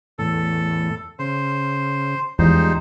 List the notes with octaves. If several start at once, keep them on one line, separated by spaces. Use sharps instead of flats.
E2 A2 A4
C#3 C5
E2 F3 G3 G#3 D#4 C5